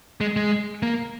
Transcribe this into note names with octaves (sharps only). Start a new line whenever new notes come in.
G#3
G#3
A#3